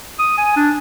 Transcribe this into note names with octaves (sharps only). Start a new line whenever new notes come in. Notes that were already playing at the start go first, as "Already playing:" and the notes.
D#6
G#5
D4